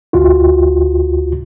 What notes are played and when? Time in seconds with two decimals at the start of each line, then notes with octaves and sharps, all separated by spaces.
0.13 D2 F4 F#4